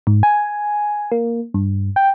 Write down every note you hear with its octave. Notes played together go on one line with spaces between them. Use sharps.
G#2
G#5
A#3
G2
G5